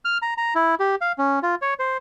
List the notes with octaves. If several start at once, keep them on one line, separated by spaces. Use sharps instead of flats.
F6
A#5
A#5
E4
G4
F5
C#4
F4
C#5
C5